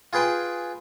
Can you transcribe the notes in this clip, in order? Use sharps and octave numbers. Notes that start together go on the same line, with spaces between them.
F4 G#4 B4 G5